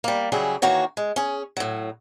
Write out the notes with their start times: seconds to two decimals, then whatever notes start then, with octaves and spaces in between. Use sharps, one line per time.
0.04 G3 A#3
0.32 C#3 F#3 G3 E4 G#4
0.62 D#3 E3 A#3 F#4 C#5
0.97 G#3
1.16 C#4 G#4
1.57 A2 F#3